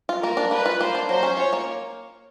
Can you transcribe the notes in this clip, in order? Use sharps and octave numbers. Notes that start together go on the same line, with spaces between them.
F4
A#3 A#4
D4
A#3 B4
F4
A#3 C5
D4
F#3 C5
C#4
F4 C#5
A#3